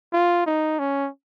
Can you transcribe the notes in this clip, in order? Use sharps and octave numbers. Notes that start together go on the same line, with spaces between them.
F4
D#4
C#4